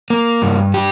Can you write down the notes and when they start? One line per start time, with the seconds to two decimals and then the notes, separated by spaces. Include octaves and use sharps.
0.10 A#3
0.42 G2
0.74 G4